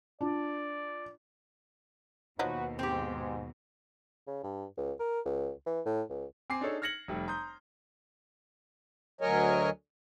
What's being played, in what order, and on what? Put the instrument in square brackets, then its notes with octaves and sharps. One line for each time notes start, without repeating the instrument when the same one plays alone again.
[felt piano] D4 F4 [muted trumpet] D5
[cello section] D#2 B2 [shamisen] F3 F#3 D#5 [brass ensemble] D#4 F#4 B4
[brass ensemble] G#2 [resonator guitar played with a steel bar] C4 G4
[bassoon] C#3
G2
C#2
A#4
C#2
E3
A2
C#2
[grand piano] C4 G#5 D6 C7
D4 D#4 G#4 A4 C#5
F6 G#6 A#6 C#7 F#7
F1 G3 A3
A#5 C6 D#6 G6
[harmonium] D2 F#3 A#4 C#5 D#5 G#5